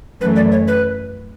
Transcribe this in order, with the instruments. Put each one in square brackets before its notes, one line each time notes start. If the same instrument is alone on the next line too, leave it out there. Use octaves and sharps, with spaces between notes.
[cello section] F#2 E3 A3 [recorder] B4
[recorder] D5
C#5
B4